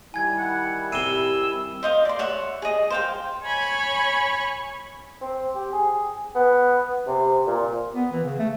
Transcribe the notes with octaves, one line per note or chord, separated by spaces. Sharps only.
D#3 G3 E4 G#5 G#6
F#5
C3 G4 E6 D#7 G7
C5 D#5 F5
D5 C6
C#5 E5 F#5
G#4 D#5
C5 F5 G5
C#5 G#5 B5 C#6
C4
G4
G#4
B3
C3
A#2
B3
E3
C#3
A3